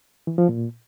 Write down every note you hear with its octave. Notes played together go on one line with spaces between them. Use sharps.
E3
F3
A#2